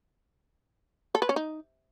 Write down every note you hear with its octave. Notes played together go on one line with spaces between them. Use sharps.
A4
B4
C#4
D#4